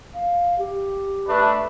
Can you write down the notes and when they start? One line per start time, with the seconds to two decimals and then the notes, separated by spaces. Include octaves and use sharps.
0.14 F5
0.59 G4
1.28 A3 D4 B4